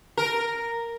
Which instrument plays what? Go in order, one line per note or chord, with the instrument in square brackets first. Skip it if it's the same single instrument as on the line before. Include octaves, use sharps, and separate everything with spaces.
[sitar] A#4